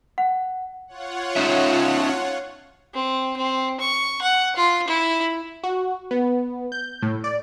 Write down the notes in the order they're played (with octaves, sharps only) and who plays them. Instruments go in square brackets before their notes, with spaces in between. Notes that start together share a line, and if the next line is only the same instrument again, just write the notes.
[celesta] F#5
[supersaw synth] F4 C#5 F#5
[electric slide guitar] C#4 D#4 E5
[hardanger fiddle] C4
C4
C#6
F#5
F4
E4
[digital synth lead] F#4
B3
G6
A2
D5